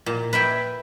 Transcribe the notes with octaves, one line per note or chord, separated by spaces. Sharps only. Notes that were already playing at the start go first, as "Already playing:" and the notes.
A#2
B4 E5 G5 G#5